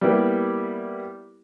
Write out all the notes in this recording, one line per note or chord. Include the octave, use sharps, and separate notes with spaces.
G3 A#3 B3 E4 G4